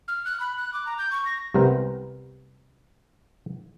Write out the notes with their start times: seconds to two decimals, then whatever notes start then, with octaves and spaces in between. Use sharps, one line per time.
0.08 F6
0.25 F#6
0.40 B5
0.57 F#6
0.74 D6
0.86 A#5
0.98 G6
1.11 C#6
1.26 A#6
1.54 C2 C3 G3 B3 A#4 C5